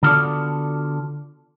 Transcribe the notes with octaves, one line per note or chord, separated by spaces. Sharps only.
D3 B3 F4 F#4 A4 D5